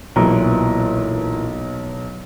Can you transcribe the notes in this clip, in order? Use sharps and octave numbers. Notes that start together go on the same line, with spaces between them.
B1 A#2 E3 A#5